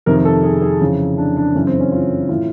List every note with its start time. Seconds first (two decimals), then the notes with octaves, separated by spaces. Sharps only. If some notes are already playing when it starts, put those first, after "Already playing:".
0.06 F2 C3 D#3 A#4
0.25 A4
0.43 G#4
0.62 G#4
0.81 F2 C#3 E3
1.18 D4
1.37 D4
1.55 F#2 C#3 E3 C#4
1.67 C4
1.80 C#4
1.92 F4
2.29 A2 E3 F4